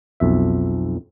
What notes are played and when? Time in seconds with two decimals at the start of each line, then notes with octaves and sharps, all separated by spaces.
0.20 B1 F2 E5